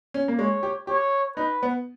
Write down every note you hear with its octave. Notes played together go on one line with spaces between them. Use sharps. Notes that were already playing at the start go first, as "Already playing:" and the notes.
C#4
A#3
G#3 C#5
G4
G4 C#5
D#4 B4
B3